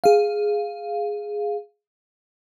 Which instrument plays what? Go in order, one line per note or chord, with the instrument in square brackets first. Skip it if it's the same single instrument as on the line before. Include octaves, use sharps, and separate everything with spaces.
[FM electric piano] G#4 F5